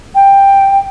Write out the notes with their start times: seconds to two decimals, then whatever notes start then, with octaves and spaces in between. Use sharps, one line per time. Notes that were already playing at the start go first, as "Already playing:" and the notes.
0.15 G5